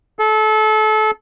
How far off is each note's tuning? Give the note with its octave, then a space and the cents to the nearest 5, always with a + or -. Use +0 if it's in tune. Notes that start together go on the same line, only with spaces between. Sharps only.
A4 -30